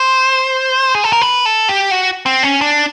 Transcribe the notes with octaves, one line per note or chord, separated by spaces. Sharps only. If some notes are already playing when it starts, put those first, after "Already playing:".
Already playing: C5
G#4
A4
A#4
B4
A4
G4
F#4
C4
C#4
D4